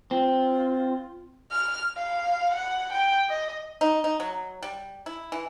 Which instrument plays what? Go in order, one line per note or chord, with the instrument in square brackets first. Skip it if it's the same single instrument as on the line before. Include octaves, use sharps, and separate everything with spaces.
[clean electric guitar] C4 [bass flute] F4
[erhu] F6
F5
F#5
G5
D#5
[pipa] D#4
D#4
F#3
G3
E4
E3